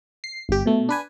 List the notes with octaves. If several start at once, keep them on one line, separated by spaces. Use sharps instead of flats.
C7
G1 G4
B2 A3
D4 B4 G#5